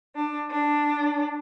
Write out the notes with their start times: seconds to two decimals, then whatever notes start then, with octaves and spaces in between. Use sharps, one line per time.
0.15 D4
0.51 D4